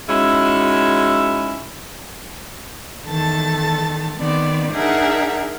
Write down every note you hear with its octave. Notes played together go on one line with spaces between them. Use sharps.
G#3 C#4 D#4 E4 F#4 E5
E2 D#3 A4 A5 A6
D#3 B3 C4 D5
D4 D#4 G#4 A#4 E5 F#5